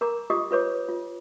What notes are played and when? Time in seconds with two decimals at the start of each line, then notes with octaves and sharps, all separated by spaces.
0.01 A#4 A#5 D6
0.30 F4 G4 D#5 D6 D#6
0.51 F4 B4 C#5 D6
0.89 F4